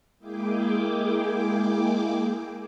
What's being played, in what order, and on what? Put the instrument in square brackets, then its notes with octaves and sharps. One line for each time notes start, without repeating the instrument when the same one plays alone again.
[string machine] G#3 A#3 E4 G#4 G5 D6